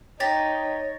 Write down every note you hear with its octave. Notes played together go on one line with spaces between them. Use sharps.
D#4 G4 C#5 A6 A#6